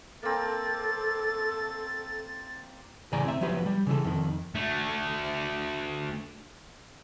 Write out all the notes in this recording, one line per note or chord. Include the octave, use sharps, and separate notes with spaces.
A#3 C4 A4 A6
A2 C#3 E3 D5 G#5 A#5
C4 E5
F3 F#3 B3 G4 B4
G3
C#3 E3 A4
F2 D#3
D2 A3